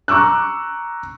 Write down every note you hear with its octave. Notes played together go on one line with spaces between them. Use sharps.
A#5 C#6 D6 E6 F#6